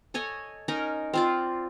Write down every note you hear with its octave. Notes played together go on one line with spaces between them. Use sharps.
A4 C#5 D#5 G#5
C#4 D#4 A#4 D#5
C4 F4 D5